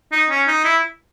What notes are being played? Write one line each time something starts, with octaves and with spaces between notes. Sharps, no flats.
D#4
C#4
D#4
E4